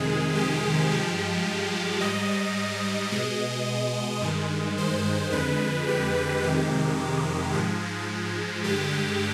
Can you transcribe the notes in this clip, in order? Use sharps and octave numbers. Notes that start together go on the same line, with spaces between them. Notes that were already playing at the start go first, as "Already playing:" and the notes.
Already playing: F2 C3 D#3 G#3 G#4
G4
G2 F3 G#3
G#2 G3 D#5
B2 G#3 D#5
G2 D#3 G#3
C5
F2 D3 G#3 B4
G4
F2 C3 D#3 G#3
G#2 F3 G#3
G2 D3 G#3 G4